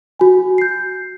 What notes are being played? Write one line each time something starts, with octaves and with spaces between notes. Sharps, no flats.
F#4 G#5
G6 C7